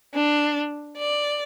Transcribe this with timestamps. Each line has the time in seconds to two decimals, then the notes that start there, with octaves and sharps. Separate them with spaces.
0.14 D4
0.98 D5